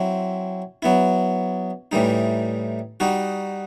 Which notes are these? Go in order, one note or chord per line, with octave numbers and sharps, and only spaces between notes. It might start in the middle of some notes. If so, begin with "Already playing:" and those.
Already playing: F#3 C4 E4
F#3 B3 E4
A2 E3 G3 D#4
G3 D#4 F#4